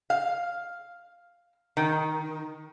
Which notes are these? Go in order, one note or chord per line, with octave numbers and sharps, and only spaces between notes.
F5
D#3